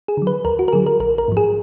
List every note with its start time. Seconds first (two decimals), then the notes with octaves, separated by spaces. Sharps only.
0.08 G#4
0.17 D3 F#3
0.27 B4
0.45 D#2 A#4
0.59 F#4
0.68 A#4
0.73 D3 F#3 G#4
0.86 A#4
1.00 A#1 A#4
1.18 A#4
1.28 G#2 F3
1.37 G#4